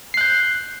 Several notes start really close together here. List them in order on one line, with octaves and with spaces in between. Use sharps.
C7 F#6 G6